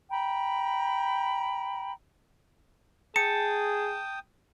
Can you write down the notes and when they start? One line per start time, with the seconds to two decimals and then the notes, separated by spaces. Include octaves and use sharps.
0.11 G5 A#5 B5
3.16 G#4 G5 A5 D#6 C#7